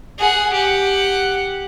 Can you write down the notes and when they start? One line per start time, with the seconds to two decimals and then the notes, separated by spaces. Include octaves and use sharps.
0.19 G#4 F#5
0.53 G4 F#5